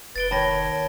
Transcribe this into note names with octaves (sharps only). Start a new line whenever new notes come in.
F1 B4 A6 D7 G7
D#2 C#5 A5 B5 A#6